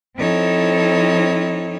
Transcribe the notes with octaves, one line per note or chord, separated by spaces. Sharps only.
F3 C4 D#4 E4 A4 C#5